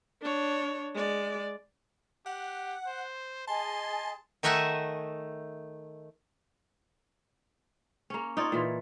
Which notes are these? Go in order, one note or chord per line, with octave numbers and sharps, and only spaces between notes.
D4 C#5
G#3 D5
G4 F#5
C5
G#4 D#5 G#5 A5 C6
D#3 A3 D#4 E5 F#5 G#5
A#3 C#4
D#4 F4 C#5 D5
A#2 E3